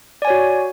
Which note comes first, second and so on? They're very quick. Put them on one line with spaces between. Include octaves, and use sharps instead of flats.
D5 G#5 C#5 F#4